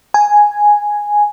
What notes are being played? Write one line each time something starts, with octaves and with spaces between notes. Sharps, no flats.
G#5